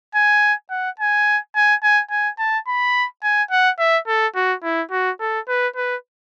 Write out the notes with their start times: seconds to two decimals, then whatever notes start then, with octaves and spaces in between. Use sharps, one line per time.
0.15 G#5
0.70 F#5
0.99 G#5
1.56 G#5
1.83 G#5
2.10 G#5
2.39 A5
2.67 B5
3.23 G#5
3.51 F#5
3.79 E5
4.07 A4
4.35 F#4
4.63 E4
4.91 F#4
5.20 A4
5.48 B4
5.76 B4